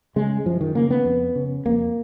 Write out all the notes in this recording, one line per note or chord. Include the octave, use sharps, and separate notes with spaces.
C#3 G#3
F#2 F3
D#3
C#3 A#3
B3
F2
C#3
F2 A#3